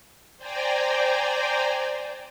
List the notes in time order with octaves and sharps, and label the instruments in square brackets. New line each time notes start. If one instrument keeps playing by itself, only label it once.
[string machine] C5 D5 G5 G#5 A#5